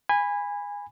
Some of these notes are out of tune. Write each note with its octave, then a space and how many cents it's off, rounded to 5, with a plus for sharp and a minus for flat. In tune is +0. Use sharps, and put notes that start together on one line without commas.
G#5 -20 B5 +0